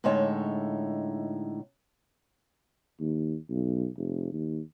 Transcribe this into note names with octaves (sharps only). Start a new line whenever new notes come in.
A2 D3 G#3 D#4 C#5 A5
D#2
B1
F1
D#2